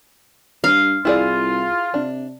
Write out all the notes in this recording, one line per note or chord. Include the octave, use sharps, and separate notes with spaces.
G2 F5
C2 E4 F4 G#4 D5
C3 D4